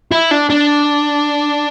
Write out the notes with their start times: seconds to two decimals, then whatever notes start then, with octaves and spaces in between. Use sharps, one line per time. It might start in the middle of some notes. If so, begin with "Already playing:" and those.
0.11 E4
0.31 D4
0.50 D4